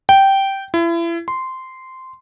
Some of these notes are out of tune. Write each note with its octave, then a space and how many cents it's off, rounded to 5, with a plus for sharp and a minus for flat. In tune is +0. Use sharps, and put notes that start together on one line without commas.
G5 -10
E4 +35
C6 -10